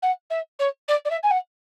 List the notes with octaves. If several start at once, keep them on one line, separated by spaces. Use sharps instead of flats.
F#5
E5
C#5
D5
D5
E5
G#5
F#5